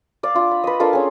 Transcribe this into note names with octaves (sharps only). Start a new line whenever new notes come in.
D5 F5
D4 F4
B5
B4 D#5
D4 F4 A4 A#4
C#4 G#4